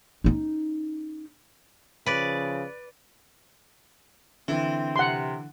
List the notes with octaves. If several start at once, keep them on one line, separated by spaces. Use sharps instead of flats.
C#4 D#4
C#3 F3 B4 D5
D3 E3 C4
C3 F#5 C6